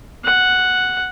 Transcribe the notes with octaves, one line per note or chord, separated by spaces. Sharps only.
F#5